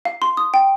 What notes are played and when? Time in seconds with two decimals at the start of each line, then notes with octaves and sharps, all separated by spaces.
0.05 F5
0.22 C6
0.37 D#6
0.54 G5